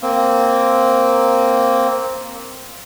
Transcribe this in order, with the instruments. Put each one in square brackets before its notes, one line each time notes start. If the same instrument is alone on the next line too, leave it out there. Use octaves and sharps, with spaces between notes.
[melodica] A#3 C4